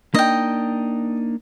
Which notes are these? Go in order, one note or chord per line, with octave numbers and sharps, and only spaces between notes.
A#3 D4 D#4 D#5 G5